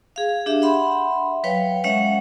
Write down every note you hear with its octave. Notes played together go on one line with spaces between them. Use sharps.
G#4 F5
D4 G4 E5
E5 F#5 B5 C6
F#3 B4 C#5 F5 G5
G#3 C#4 C#5 E5 F#5